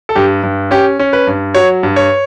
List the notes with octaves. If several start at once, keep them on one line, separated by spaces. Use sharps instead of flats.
A4
G2 G4
G2
C#4 G4
C#4
B4
G2
F#3 C#5
G2
C#5